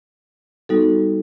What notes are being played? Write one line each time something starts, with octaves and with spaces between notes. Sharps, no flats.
G3 B3 D#4 F#4 A4